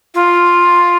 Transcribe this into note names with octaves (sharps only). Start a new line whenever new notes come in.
F4